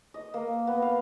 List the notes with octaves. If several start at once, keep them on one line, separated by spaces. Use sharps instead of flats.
D#5
A#3
B3
F5